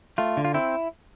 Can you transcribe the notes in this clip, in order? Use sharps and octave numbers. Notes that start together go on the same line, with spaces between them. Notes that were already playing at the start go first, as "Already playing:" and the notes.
A3 F4
D3
F4
C4 E4